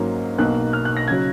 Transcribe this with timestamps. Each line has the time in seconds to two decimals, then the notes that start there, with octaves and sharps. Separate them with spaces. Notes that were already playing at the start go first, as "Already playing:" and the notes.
Already playing: G#2 F#3 A#3 C#4
0.38 B1 B2 A#3 F#6
0.73 F6
0.85 F#6
0.97 A#6
1.08 C#3 F#3 G#6